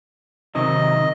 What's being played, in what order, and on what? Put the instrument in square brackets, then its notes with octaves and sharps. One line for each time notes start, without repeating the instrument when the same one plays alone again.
[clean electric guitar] C3 D#3 F#3 [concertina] D#5